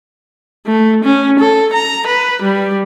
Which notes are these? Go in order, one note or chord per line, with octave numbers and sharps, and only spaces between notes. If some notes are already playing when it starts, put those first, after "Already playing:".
A3
C#4
A4
A#5
B4
G3